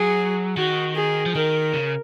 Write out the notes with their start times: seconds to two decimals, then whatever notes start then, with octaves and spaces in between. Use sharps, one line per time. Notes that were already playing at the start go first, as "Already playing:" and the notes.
Already playing: F#3 G#4
0.57 D#3 F#4
0.96 G#4
1.26 F3
1.35 D#3 A#4
1.74 C#3